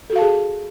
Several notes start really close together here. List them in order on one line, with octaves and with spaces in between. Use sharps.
A4 F#4 F5 A5 G#4